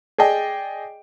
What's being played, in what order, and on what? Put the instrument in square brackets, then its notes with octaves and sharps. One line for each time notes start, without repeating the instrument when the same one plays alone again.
[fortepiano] G#4 D5 D#5 G5